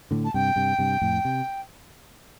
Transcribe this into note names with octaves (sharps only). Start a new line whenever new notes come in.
A2 D3
A5
G2 C3 G5
G2 C3
G2 C3
F2 A2
C3